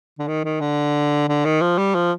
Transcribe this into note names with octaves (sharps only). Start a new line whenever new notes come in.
D3
D#3
D#3
D3
D3
D#3
F3
G3
F3